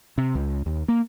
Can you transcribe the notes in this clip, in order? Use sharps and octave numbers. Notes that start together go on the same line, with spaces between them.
C3
C#2
D#2
A#3